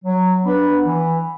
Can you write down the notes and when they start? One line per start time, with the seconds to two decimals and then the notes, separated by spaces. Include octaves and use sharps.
0.04 F#3
0.45 B3 D4 B4
0.84 E3